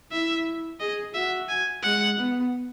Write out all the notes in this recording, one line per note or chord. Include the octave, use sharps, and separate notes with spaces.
E4 E5
G#4 D#5
F#4 E5
G#5
G#3 F#5
B3